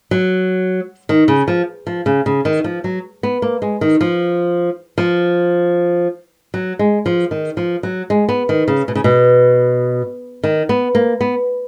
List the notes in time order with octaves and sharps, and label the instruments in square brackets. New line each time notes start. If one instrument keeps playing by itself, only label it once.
[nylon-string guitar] F#3
D#3
C#3
F3
F3
C#3
C#3
D#3
F3
F#3
B3
A#3
G#3
D#3
F3
F3
F#3
G#3
F3
D#3
F3
F#3
G#3
B3
D#3
C#3
B2
C#3
B2
D#3
B3
A#3
B3